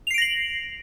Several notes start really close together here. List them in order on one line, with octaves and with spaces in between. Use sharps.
F7 C7 D7 A#6 F#7